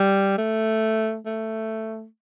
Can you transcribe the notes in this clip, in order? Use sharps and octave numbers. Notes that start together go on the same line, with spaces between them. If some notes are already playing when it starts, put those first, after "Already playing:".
Already playing: G3
A3
A3